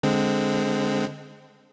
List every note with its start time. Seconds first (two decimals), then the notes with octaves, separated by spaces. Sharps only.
0.03 D3 G#3 C4